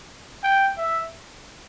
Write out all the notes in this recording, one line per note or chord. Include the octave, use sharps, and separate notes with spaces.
G5
E5